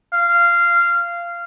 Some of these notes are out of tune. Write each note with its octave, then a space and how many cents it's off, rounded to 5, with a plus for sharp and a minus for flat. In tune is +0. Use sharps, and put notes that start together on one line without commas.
F5 -15